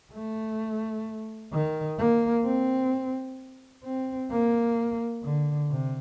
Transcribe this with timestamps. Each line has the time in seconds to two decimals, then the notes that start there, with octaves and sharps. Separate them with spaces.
0.13 A3
1.52 D#3
1.98 A#3
2.45 C4
3.84 C4
4.31 A#3
5.23 D3
5.70 C3